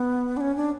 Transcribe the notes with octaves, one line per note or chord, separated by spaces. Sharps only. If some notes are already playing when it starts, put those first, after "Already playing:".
Already playing: B3
D4
C#4
D4